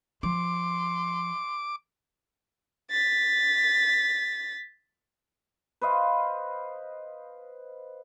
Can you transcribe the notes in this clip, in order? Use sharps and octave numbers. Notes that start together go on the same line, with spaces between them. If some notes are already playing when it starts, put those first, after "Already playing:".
F3 C6 D6
A6 B6
B4 C5 D#5 F5